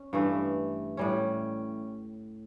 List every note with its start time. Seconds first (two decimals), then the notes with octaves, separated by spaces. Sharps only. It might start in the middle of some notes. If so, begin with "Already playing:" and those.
Already playing: C#4
0.13 G2 E3 A3
0.97 A2 G3 C#4